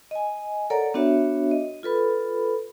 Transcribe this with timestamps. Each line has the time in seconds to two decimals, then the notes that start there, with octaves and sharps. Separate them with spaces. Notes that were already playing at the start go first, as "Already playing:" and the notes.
0.11 D#5 G#5
0.70 A4 A#4 C#5 D5 F#5 A#5
0.94 B3 D4 F#4 C#5 E5
1.51 D#5
1.83 F4 A4 B4 B5